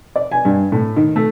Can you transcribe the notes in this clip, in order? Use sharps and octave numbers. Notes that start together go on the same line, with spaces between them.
D5
G#5
G2
A2
D#3
A3